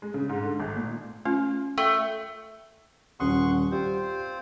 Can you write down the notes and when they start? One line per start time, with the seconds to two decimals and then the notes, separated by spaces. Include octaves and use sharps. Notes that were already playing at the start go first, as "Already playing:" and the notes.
0.02 G#3
0.14 C#3
0.29 G#2
0.43 D3
0.60 G#1
0.77 A#2
1.25 A3 C#4 F4
1.78 A3 G5
3.20 D#1 C#4 F#5 C6 C#6 D#6
3.71 G3 C4 F4 C5